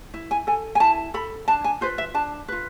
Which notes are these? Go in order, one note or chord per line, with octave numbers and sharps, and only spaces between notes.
E4
G#5
A4 G#5
G#5
E4 A5
A4 B5
D4 A5
G#5
F4 B4 C5
E5
D4 A5
F4 B4